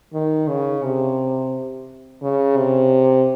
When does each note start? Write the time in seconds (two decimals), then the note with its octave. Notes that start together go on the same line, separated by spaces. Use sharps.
0.14 D#3
0.49 C#3
0.84 C3
2.23 C#3
2.57 C3